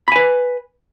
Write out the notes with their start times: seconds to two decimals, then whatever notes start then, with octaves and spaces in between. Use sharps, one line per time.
0.08 B5
0.12 G#5
0.16 B4